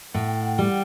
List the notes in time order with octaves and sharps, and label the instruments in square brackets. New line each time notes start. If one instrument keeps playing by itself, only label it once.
[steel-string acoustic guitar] A2 [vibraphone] F#5
[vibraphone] G5
F#5
[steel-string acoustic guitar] G3 [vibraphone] F#5